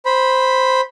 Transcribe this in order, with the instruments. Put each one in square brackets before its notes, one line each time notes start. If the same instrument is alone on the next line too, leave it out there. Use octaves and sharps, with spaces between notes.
[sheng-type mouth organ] C5 B5